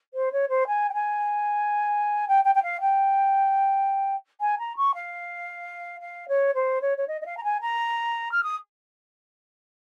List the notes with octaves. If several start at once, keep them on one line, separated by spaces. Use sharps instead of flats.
C5
C#5
C5
G#5
G5
G#5
G5
G5
G5
F5
G5
G#5
A#5
C#6
F5
F5
C#5
C5
C#5
C#5
D#5
D#5
F5
A#5
G#5
A#5
F6
D#6